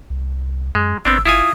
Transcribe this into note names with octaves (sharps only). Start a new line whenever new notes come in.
C2
F#2 G#3
G#1 B3 C4 D4 E6
G1 E4 F4 G#5 D#6